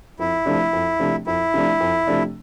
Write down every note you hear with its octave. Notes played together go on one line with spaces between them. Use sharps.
F2 E4
C3 F3 A3 D4
F2
C3 F3 A3 D4
F2 E4
C3 F3 A3 D4
F2
C3 F3 A3 D4